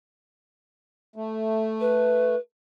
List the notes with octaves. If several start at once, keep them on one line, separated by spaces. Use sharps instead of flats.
A3
B4